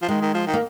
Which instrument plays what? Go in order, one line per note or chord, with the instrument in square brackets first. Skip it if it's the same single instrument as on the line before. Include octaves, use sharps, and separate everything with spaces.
[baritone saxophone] F3
[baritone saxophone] D#3 [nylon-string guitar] G#3
[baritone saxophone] D#3
F3
D#3
[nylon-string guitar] A#3